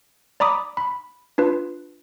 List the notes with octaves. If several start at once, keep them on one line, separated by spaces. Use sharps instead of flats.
D5 A#5 B5 D6 D#6
B5
D4 F4 B4